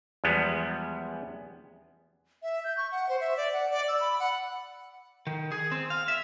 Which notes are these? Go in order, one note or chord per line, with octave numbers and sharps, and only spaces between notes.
E2 F3 G3 G#3 B3
E5
G6
C#6
F#5
C5
E5
D5
F#5
D5
E6
B5
F#5
D#3
G#4
C4
F5
E5